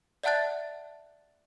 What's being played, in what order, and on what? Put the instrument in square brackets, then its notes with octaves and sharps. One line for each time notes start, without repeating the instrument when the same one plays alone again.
[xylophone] D5 E5 F#5 A5 F#6 A6